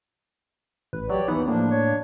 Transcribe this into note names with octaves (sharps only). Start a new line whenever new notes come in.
A1 B4
F#3 G4 C#5 D5
D#2 E3 B3 D#4 F#5
A2 F3 A#3 D4
C#5